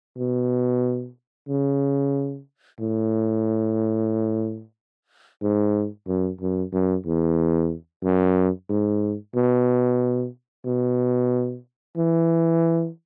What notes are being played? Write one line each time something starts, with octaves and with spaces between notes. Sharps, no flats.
B2
C#3
A2
G#2
F#2
F#2
F#2
E2
F#2
G#2
B2
B2
E3